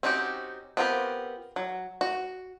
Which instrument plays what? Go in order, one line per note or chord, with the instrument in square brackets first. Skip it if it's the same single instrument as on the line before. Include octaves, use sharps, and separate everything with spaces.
[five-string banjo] C4 C#4 D#4 F#4 G4
B3 C4 F4 G4 A#4
F#3
F#4